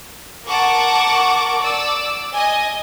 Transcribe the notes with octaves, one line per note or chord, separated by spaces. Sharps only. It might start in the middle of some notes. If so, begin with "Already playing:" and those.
A#4 F#5 A5 C#6 D6
D5 E6
D#5 G#5